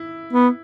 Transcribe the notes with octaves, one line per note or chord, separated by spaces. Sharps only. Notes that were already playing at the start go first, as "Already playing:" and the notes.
Already playing: E4
B3